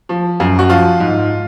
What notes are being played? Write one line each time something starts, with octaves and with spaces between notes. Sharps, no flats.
F3
F#2
F#4
F3 F4
G#2